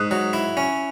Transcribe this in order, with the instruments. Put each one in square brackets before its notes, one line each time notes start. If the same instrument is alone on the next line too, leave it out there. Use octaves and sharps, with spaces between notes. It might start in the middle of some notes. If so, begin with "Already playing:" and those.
Already playing: [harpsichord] G#2 [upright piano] D#6 F#6
[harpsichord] F#3
E4
C#4